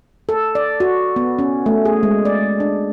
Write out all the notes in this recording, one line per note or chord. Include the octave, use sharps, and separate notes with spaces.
A4
D5
F#4
B3
C#4
A3
G#4
G#3
D5
D4